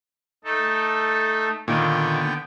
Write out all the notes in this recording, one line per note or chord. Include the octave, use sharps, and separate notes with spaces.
A3 D#4 A4
A#2 D3 D#3 B3 G5